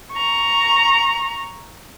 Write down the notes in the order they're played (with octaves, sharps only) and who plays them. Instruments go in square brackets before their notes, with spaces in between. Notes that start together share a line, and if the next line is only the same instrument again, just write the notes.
[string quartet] A#5 C#6